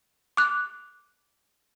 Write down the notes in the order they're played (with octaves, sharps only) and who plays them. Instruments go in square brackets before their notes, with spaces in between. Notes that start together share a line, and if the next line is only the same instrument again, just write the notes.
[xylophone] D6 F#6